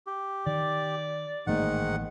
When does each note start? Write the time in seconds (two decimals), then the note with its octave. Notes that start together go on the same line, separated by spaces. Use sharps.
0.07 G4
0.47 D#3 D5
1.47 A1 G#2 D#3 A3 A#3 F#5